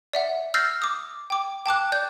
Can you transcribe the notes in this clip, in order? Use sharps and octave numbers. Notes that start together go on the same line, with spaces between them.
D5 E5 F#5
E6 F6 G6 A6 A#6 C7
D6 D#6
G5 D6
G5 A5 D6 F#6
D5 G6